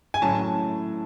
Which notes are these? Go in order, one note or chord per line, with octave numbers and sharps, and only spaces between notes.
G#5
A2 F#3 C#4 A5